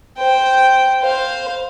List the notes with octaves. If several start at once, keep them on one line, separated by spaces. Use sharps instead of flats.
C5 G5
C5 F5